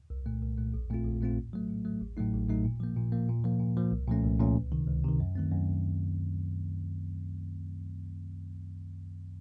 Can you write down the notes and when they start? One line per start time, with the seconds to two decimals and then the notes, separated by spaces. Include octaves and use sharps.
0.10 C2
0.26 A#2 A3
0.42 C2
0.58 A#2 A3
0.74 A#1
0.90 A#2 A3 C4 F4
1.05 A#1
1.21 A#2 A3 C4 F4
1.37 A2
1.53 F#3 A3
1.69 A2
1.85 F#3 A3
2.01 A1
2.17 A2 F#3 A3 D#4
2.33 A1
2.49 A2 F#3 A3 D#4
2.65 A#2
2.80 F3 A#3
2.97 A#2
3.12 F3 A#3
3.29 A#2
3.44 F3 A#3
3.60 A#2
3.77 F3 A#3
3.92 C2
4.08 A#2 F3 A3 C#4
4.24 C2
4.40 A#2 F3 A3 C#4
4.56 C#2
4.72 C3 D#3
4.87 C#2
5.04 C3 D#3
5.20 F#2
5.35 D#3 A3 C4
5.52 F#2